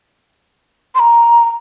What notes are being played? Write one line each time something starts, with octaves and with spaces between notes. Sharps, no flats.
C6
A#5